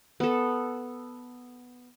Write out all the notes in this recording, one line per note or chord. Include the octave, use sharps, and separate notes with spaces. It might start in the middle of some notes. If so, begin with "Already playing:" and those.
B3 A4